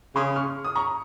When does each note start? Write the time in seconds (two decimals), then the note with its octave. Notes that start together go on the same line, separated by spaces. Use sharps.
0.16 C#3 C6 D#6
0.36 C#6 F6
0.64 D#6
0.76 A#5 C#6